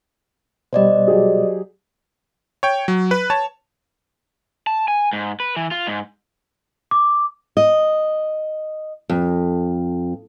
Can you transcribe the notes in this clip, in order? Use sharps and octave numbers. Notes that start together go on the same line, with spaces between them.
B2 G3 C5 D5 D#5
F#3 G4 G#4
C#5 G5
F#3
B4
C#5 A5
A5
G#5
G#2
B4
E3
F4
G#2
D6
D#5
F2